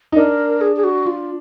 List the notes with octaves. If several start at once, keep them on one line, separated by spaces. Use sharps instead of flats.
D#4
D4 A#4
G#4
G#4
F#4
F4